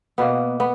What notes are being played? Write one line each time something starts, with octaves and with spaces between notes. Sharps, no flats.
B2 A#3 B3
B3